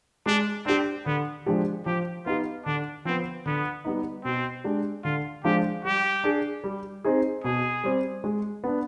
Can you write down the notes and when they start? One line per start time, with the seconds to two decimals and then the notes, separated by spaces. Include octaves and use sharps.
0.26 G#3 D4
0.66 C4 D4 G4
1.06 D3 B3
1.46 F3 G#3 D4 G4
1.86 F3 G4
2.26 B3 D#4 F4 G4
2.65 D3 D4
3.05 F3 B3 C4
3.46 D3 B3
3.85 G3 B3 D#4
4.24 B2 C4
4.64 G#3 D4 G4
5.04 D3 F4
5.44 F3 G#3 D4 F4 G4
5.85 G3 G4
6.24 D4 G#4
6.64 G3
7.04 C4 D#4 G#4
7.44 B2 G#4
7.84 G3 C4
8.24 G#3
8.64 B3 D4